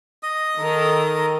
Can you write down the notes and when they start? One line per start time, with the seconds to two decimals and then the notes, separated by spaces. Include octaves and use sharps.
0.23 D#5 D#6
0.59 D#3 A4 A#4